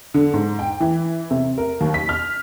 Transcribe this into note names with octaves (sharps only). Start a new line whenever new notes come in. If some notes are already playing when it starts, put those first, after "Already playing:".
D3
G#2
G5
E3
C3
A#4
D#2
B6
F6